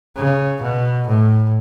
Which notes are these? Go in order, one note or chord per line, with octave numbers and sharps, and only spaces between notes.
C#3
B2
A2